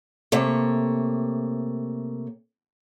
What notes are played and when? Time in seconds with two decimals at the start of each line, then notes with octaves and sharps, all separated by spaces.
0.32 C3 A3 A#3 C#5